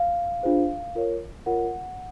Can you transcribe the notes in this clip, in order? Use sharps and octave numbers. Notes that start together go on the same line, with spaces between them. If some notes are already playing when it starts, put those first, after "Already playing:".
Already playing: F5
D4 F4 G#4 C5
F4 A#4 C#5
F4 A#4 C#5 F#5